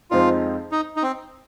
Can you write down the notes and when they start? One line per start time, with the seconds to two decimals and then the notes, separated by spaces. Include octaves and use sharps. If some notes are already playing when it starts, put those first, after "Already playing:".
0.11 F2 F3 G#3 C4 D#4 F4
0.72 D#4
0.96 D#4
1.03 C4